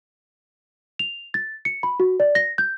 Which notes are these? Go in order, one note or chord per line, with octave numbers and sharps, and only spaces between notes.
F7
A6
C#7
B5
F#4
D5
A#6
G6